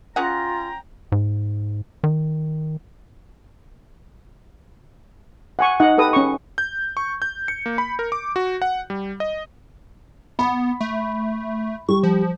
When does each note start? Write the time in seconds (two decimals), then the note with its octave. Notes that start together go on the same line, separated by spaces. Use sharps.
0.16 C#4 F4 G#4 F#5 G5 A#5
1.12 G#2
2.04 D#3
5.59 F#5 G#5 C#6
5.80 D#4 D#5 F#5
5.98 G4 A4 B4 D#6
6.13 C#4 C#6
6.58 G6
6.97 C#6
7.22 G6
7.48 C#7
7.66 A#3
7.78 B5
7.99 A#4
8.12 D6
8.36 F#4
8.62 F#5
8.90 G3
9.20 D#5
10.39 B3 B5
10.81 A3
11.89 G3 C#6
12.03 F3